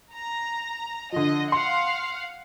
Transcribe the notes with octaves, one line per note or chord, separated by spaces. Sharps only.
A#5
D3 F3 D#5
F5 F#5 C6